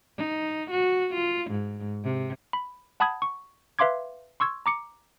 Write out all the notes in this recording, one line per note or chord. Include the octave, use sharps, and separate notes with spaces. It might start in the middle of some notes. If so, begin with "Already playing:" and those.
D#4
F#4
F4
G#2
C3
B5
F#5 A5 B5 D#6 G#6
C#6
B4 E5 F5 C6 D6 G#6
C6 C#6 E6 G#6
A#5 D6 C#7